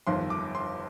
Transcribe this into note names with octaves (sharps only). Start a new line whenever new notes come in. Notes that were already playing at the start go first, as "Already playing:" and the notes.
G1 F2 D#3 C6
D6
C6